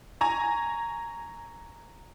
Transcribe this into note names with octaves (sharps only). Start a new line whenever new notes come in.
G#5 A#5 C#6